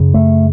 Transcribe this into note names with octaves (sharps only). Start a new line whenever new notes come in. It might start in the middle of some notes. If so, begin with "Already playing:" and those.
Already playing: F#2 C#3
A3